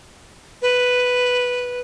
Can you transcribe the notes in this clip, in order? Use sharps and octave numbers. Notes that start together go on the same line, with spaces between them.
B4